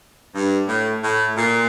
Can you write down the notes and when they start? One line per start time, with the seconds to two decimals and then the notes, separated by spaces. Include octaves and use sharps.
0.35 G2
0.68 A2
1.03 A2
1.37 A#2